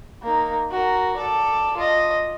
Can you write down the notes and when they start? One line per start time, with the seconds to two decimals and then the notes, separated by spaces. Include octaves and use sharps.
0.23 A#3 D#4
0.71 F#4 A#4
1.17 A4 D5
1.77 F4 D#5